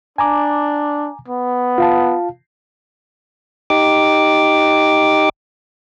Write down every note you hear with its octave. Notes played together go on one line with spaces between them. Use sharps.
D4 G#5 A#5 D6
B3
F4 F5 A5
D#4 G4 D6